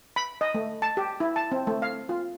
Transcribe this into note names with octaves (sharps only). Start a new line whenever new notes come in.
B5
D#5
A3
A5
G4
E4
A5
C4
A3
F5
F4